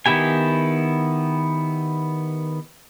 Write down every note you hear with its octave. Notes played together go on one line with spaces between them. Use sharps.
D#3 B3 E4 G4 G#5